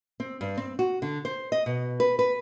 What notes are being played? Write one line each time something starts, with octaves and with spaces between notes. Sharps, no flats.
C4
G2
C4
F#4
D3
C5
D#5
B2
B4
B4